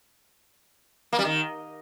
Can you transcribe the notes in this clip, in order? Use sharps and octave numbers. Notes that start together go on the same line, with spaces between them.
A#3
G3
D#3